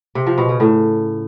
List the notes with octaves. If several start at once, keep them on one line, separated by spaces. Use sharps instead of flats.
C3
F3
B2
C#3
A2